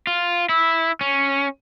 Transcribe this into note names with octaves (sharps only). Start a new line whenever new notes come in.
F4
E4
C#4